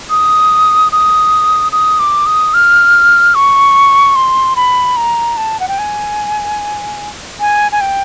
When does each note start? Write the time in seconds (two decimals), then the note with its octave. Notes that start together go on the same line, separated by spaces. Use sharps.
0.10 D#6
0.92 D#6
1.72 D#6
1.99 D6
2.26 D#6
2.54 F6
3.35 C#6
4.16 C6
4.56 B5
4.97 A#5
5.37 A5
5.60 F#5
5.68 G5
5.79 G#5
7.40 G#5
7.72 G#5
7.81 G5